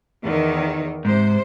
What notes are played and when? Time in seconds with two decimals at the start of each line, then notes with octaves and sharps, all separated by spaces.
0.23 E2 D#3
1.05 G#2 C3 C5